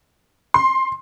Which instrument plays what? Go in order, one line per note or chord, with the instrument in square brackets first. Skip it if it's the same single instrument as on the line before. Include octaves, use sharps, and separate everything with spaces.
[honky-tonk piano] C6